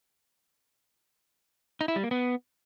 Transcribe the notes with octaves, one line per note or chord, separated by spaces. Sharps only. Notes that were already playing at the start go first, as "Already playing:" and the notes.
D#4
E4
G3
A#3
B3